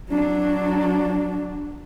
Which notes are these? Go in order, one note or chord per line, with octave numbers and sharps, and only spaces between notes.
F#3 D4